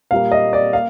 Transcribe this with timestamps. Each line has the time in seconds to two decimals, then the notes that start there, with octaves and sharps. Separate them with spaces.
0.11 A#2 G3 A#3 F5
0.32 D#5
0.53 D5
0.73 A#3 F5